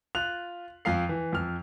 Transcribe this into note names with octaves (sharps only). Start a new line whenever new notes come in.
F4 F#6 F7
F2 F3 F5 C7
E3
F2 F6